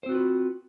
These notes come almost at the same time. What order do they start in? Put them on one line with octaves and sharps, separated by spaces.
C5 C4 F#4 F4 B4